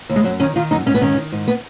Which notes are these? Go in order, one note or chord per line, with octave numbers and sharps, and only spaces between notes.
D#2
G#3
F#2 F#3
D#3 C#4
D#3 F4
F#2 D#4
G#2 C#4
B3
D#3 C#4
D#3
G#2
B3